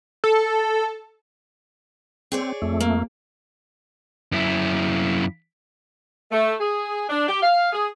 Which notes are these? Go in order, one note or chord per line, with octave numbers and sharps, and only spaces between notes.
A4
C4 G#4 C#5 D5
F2 A3
A#3
F#2 E4
A3
G#4
D4
G4
F5
G#4